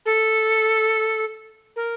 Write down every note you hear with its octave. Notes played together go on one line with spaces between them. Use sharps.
A4
A#4